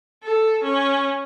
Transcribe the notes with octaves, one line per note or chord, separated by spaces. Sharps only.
A4
C#4